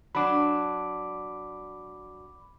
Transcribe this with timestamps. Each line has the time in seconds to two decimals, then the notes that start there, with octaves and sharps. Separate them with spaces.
0.15 F#3 D4 B5 D6